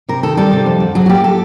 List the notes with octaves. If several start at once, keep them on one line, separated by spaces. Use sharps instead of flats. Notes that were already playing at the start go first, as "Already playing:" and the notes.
C3 A#4
D#3 A4
G3 A4
C3
F2
D3
F#3 G#4
F#4
A#3 G4
A4